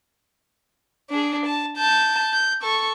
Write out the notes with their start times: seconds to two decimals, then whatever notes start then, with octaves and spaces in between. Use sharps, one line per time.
1.10 D4 G#4
1.46 A5
1.77 A5 G6
2.33 G6
2.62 A4 C#6